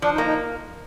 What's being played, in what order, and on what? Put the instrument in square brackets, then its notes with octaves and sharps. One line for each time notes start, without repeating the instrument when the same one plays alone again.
[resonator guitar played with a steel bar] F3 [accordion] D4
[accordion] D#4
[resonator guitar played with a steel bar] A#3
[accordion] D#4